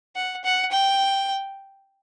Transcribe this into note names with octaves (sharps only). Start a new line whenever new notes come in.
F#5
F#5
G5